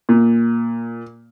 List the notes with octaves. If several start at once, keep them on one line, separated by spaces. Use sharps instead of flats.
A#2